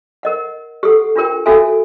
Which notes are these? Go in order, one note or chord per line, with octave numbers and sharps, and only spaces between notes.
A#4 D#5 F#5
G4 A4 F#5
D4 F4 G4 A#4 G5
C#4 F#4 A4 E5 F5 G#5